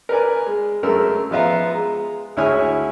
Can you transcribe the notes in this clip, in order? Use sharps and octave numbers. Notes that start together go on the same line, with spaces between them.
A#4 B4 D5 G#5
G#3
F#2 G#3 A3 A#4 E6
F3 B3 F4 E5 F5 A#5
G#3 A#5
D2 G#3 E4 C#5 G#5 F6